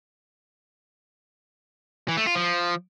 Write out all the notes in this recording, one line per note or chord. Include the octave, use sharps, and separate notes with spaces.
E3
A3
F4
F3